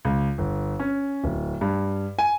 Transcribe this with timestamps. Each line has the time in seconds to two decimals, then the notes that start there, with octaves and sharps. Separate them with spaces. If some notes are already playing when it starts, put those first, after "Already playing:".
0.05 C#2
0.38 G1
0.80 C#4
1.24 D1
1.61 G2
2.19 G#5